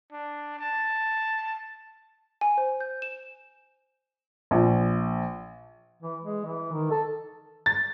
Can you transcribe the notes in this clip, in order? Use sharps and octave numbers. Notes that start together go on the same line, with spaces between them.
D4
A5
G#5
C5
G6
E7
A#1
E3
G#3
E3
D#3
A4
A6